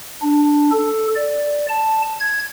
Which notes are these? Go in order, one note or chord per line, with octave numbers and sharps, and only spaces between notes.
D4
A4
D5
A5
G#6